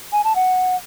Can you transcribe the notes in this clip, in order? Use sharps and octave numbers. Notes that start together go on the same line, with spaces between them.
G#5
A5
F#5